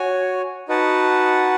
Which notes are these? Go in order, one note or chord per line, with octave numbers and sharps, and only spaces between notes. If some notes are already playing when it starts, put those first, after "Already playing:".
Already playing: F#4 C#5 G#5
D#4 F#4 B4 F#5 A5